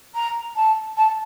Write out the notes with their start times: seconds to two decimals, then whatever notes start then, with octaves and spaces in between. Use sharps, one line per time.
0.14 A#5
0.56 A5
0.97 A5